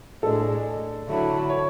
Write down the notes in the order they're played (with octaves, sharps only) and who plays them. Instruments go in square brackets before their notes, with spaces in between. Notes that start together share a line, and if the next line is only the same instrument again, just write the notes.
[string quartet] A2 G#3 D4 [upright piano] A4
[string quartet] D3 F#3 A3 E4
[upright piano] C#5